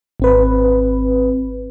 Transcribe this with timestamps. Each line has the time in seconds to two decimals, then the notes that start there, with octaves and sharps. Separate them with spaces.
0.20 G#1 C4 B4